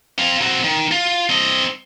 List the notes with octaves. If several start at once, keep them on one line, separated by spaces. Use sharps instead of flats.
C4 F5
C4 F#4
D#3
F4
C4 D#5